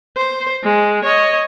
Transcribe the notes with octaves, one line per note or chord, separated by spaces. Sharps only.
C5
G#3
C#5 D#5